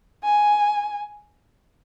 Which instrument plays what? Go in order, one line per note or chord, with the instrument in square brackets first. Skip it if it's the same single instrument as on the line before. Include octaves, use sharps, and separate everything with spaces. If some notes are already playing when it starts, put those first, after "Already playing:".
[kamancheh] G#5